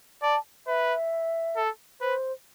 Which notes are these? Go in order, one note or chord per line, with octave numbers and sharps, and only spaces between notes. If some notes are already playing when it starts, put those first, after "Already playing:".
D5 A5
B4 E5
A4
B4 C5